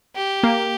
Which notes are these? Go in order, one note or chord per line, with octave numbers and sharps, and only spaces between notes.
G4
A#3